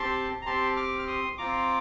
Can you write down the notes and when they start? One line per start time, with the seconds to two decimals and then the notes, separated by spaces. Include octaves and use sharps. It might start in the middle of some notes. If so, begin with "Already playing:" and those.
Already playing: C4 G4 A5 C6
0.42 A#5
0.46 C4 G4 A5 C6
0.77 D6 F6
0.99 F6
1.07 C6 D#6
1.38 C4 F4 A#5 D6